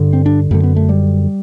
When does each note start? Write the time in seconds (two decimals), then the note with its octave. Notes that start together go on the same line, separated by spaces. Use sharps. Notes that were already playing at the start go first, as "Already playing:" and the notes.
Already playing: G2 D3
0.13 C4
0.26 D4
0.51 F#2 D3 A3
0.63 B3
0.76 A3
0.89 G3